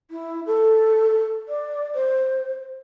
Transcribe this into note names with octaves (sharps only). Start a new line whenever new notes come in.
E4
A4
D5
C5